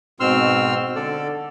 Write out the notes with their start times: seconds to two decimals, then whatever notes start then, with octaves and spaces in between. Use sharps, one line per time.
0.20 G#2 B2 C4 C6 E6 F6
0.95 D3 A4 D5